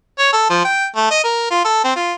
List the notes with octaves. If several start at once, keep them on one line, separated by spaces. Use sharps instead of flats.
C#5
A4
F3
G5
A3
D#5
A#4
F4
A4
C4
F4